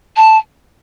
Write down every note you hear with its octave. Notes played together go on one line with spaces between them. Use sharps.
A5